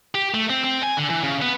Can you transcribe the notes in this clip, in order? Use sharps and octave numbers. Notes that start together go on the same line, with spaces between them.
G4
A3
C4
C4
G#5
D3
E3
C#3
B3